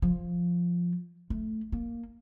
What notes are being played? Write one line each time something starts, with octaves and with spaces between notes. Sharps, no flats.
F3
A3
A#3